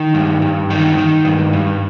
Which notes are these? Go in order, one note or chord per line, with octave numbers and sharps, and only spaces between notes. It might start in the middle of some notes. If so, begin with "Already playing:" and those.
Already playing: D#3
G2
G2
D#3
D#3
G2
G2